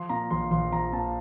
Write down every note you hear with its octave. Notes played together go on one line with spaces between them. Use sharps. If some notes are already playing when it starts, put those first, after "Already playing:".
Already playing: F3 C6
A#2 A#5
A#1 C6
A#1 C6
F3 A#5
A#2 A5